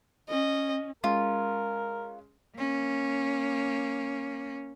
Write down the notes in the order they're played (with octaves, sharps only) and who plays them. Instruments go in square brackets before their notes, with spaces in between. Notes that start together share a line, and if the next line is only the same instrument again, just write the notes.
[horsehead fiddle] C#4 [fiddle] D#5
[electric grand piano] G#3 C#4 [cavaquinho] F4 [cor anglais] A#4
[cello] A#3 C#4